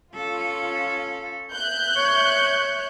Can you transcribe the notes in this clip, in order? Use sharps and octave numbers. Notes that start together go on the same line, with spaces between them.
C#4 F4 A4
E5 F#6 G6
C#5